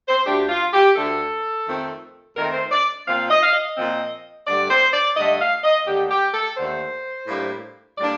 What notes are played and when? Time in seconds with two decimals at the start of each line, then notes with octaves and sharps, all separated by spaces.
0.09 C5
0.26 D2 D3 A3 D4 G4
0.49 F4
0.73 G4
0.96 D2 D3 A3 D4 A4
1.66 F2 D#3 A3 C4
2.37 F2 D#3 A3 C4 A#4
2.54 C5
2.72 D5
3.06 A#2 F3 C4 F5
3.30 D#5
3.43 F5
3.53 D#5
3.77 A#2 F3 C4
4.47 G2 D3 A3 D5
4.70 C5
4.93 D5
5.17 G2 D3 A3 D#5
5.41 F5
5.64 D#5
5.87 D#2 D3 A3 G4
6.11 G4
6.34 A4
6.57 D#2 D3 A3 C5
7.27 A2 G3 A#3 D4
7.98 A2 G3 A#3 D4 D5